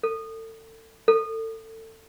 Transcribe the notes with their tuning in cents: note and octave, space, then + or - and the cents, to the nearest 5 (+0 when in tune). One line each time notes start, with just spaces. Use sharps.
A4 +30
A4 +25